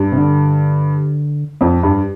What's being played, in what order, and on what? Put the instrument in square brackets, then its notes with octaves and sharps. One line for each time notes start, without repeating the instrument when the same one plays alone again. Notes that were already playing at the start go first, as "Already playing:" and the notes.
Already playing: [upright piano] G2
[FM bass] C3
D3
[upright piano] F2
G2